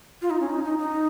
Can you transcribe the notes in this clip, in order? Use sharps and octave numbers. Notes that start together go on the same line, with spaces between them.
F4
D#4
C#4
D#4
D#4
D#4